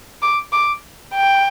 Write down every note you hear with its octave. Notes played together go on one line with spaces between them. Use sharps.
D6
D6
G5